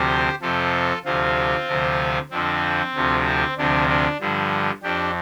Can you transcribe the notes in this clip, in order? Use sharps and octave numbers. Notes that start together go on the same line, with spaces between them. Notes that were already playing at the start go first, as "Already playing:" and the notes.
Already playing: D2 C3 F3 G4 C5
F2 C3 F3 F4 A4
D2 C3 F3 C4 F4
D2 C3 F3
F2 D3 F3 C4
D2 C3 F3
C4
D2 C3 F3 D4
D4
G2 D3 F3
F2 F3 D4 G4